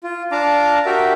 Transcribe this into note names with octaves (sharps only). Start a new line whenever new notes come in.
F4
D4 F5 A5 A#5 D6
F#4 G4 A#4 E5